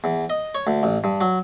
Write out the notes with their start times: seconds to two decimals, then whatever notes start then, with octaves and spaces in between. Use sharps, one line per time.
0.04 E2
0.30 D#5
0.55 C#5
0.67 D2
0.83 A1
1.04 G2
1.21 F#3